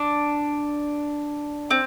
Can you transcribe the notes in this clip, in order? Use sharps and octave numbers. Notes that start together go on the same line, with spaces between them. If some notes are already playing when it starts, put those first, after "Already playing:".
Already playing: D4
C4